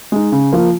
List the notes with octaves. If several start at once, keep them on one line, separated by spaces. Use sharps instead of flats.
G#3 D#4
C#3
F3 A#3 F4